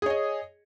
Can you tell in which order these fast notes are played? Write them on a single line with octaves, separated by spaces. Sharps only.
G#4 C#5 D#5